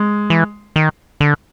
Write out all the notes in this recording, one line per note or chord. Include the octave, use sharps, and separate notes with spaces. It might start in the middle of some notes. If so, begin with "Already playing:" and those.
Already playing: G#3
E3
D#3
D3